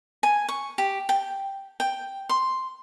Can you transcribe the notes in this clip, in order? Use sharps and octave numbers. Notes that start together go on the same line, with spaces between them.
G#5
C#6
G4
G5
G5
C6